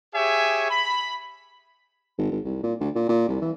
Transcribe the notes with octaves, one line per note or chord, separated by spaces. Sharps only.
G4 G#4 C#5 E5 G#5
B5
G#1
G#1
C2
A#2
D2
A#2
A#2
C2
E3